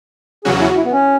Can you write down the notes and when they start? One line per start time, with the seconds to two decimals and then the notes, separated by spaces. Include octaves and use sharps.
0.45 E2 C#3 F#3 C#4 F#4 G#4
0.61 E4
0.69 F#4
0.77 E4
0.84 B3
0.92 C#4